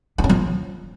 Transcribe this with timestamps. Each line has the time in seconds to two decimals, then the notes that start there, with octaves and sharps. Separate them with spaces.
0.18 D4
0.24 C#4
0.29 F3